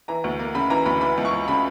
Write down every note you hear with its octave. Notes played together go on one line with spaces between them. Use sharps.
E3 A#5
D2
A#3
C#3 B5
E3 A#5
D2 B5
E3 B5
C#2
C#6
C#2
C#3 B5